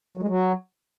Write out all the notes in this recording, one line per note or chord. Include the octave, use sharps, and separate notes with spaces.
F#3
G#3
F#3